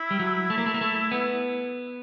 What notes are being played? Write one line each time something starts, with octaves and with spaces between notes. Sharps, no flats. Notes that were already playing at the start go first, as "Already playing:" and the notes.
Already playing: E4
G3
F#3
A3
A#3
A3
A#3
A3
B3